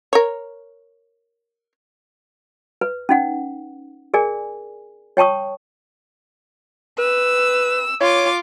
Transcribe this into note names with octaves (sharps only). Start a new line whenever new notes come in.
A#4 C#5
B4
C#4 D#4 F#5
G#4 A#4 D5 G#5
C#5 G5 A5 C#6 D#6
B4 E6
F4 C#5 D6